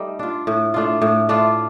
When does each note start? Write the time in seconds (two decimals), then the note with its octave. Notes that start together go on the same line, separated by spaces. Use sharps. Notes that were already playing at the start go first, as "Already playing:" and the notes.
Already playing: G3 A3 D#4
0.19 D4 F4
0.47 A2
0.74 A3 D4 F4
1.02 A2
1.29 A3 D4 F4